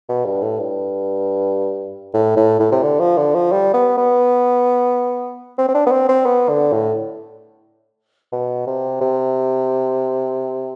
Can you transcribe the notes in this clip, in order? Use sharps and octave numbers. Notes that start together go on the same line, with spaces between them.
B2
G2
A2
G2
A2
A2
A2
C3
D3
F3
D3
F3
G3
B3
B3
C4
C4
D4
B3
C4
C4
B3
D3
A2
B2
C3
C3